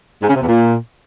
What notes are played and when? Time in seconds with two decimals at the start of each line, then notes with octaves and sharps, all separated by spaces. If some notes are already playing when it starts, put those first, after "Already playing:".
0.22 G#2
0.29 C#3
0.35 C3
0.41 E2
0.48 A#2